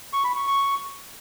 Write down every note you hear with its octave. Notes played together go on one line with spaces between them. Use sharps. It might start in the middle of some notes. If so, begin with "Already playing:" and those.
C#6
B5
C#6
C#6